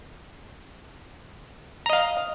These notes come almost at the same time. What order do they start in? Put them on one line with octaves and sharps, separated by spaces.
A#5 D#5 F5